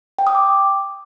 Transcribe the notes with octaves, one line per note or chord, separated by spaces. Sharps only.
G5
D#6
D6